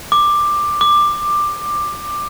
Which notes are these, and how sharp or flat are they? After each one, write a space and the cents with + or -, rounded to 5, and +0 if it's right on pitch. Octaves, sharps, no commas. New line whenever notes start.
D6 +10
D6 +15